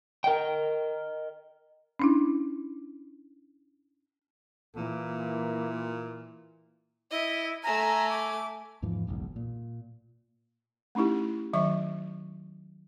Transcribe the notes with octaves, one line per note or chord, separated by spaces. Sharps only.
A#4 D#5 G5
C#4 D4 E4
A#2 E3 A#3
E4 D#5
A3 G#5 A#5
D6
E2 G#2 E3 F3
F#1 B1 E2 G#2
A#2
A3 C#4 D#4 E4 G4
D#3 F#3 E5 C#6